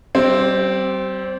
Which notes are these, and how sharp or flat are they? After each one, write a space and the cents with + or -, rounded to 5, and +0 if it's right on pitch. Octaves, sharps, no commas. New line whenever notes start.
G3 -35 C4 +0